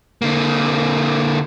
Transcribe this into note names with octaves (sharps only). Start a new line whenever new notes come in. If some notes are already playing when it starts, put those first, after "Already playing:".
D3 A#3